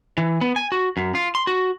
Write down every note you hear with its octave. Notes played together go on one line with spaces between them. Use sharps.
E3
B3
G#5
F#4
F#2
F4
C6
F#4